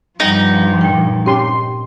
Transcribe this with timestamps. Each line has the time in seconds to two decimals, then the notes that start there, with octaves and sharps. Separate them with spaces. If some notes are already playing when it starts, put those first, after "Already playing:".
0.20 G2 F3 G3 D#4 F#5
0.81 A#2 G5
1.26 C4 C#4 G4 C6